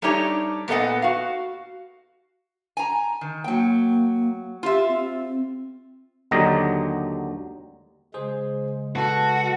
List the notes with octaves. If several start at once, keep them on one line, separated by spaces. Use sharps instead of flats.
G3 A3 D4 D#4 G4 C#5
A#2 B3 A4 D#5 F#5
F#4 F5
G#5 A#5
D#3
F#3 A#3 G5
F4 G4 E5
C4
D#2 D3 F#3 G4 D#5 A#5
C#3 G#3 G#4 C5
F#4 A4 B4 A5